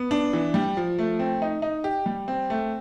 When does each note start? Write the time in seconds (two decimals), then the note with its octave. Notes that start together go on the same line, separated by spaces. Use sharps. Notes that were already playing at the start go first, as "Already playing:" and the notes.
Already playing: B3
0.11 D4
0.33 E3
0.54 G3
0.77 F3
0.99 A3
1.19 C4
1.42 D#4
1.62 D#4
1.84 G4
2.06 G3
2.28 C4
2.50 A3